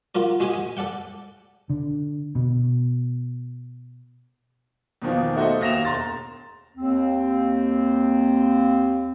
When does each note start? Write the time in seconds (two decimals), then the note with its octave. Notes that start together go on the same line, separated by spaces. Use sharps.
0.15 F4 F#4 A#4 D5
0.40 G#3 F#4 G4 D#5 G#5
0.54 D#5
0.77 A4 D5 F#5 G5
1.70 D3
2.35 B2
5.02 E2 B2 D#3 F3 A#3
5.36 A3 F#4 C5 D#5
5.61 D#2 A#6 E7 F7
5.85 E1 A#5 C6 A6
6.77 D#2 C4